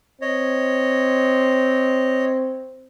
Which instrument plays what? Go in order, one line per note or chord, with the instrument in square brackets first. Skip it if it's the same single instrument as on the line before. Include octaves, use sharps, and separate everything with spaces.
[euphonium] C4 [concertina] C#5 D#5